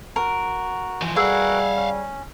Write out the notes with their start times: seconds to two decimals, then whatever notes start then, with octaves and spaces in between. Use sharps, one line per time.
0.16 F#4 A#4
1.02 E3 F3
1.16 G3 F#4 G#4 A#4 B4 F5 F#5 E6
1.76 C#4